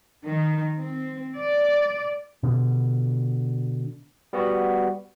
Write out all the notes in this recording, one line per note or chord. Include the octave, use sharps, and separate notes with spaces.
D#3
C4
D5
B2 D3
G3 B3 F#4